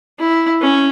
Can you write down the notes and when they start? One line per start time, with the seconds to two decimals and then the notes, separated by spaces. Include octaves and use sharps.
0.19 E4
0.62 C#4